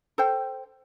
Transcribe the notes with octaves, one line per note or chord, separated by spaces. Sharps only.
A4 C5 G5